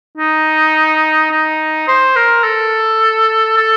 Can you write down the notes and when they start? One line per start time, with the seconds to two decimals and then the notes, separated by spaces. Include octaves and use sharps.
0.17 D#4
1.31 D#4
1.87 C5
2.16 A#4
2.44 A4
3.57 A4